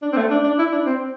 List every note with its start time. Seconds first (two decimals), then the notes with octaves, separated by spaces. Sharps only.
0.02 D4
0.13 C4
0.17 A3
0.31 D4
0.44 D4
0.59 E4
0.72 D4
0.86 C4